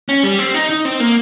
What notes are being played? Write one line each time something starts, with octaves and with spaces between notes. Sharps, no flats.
C#4
G3
C4
D#4
D#4
C4
A#3